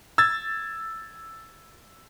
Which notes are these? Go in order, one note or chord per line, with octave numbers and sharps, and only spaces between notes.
E6 G#6 A6